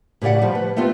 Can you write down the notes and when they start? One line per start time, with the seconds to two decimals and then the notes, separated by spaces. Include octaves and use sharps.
0.22 A2 C#3 G4 D5 F#5
0.42 F3 G3
0.55 B4
0.76 A3 B3 C4 F4 G4